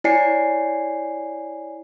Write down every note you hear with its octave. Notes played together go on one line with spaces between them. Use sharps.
E4 C#5 D5 G#5 C7 C#7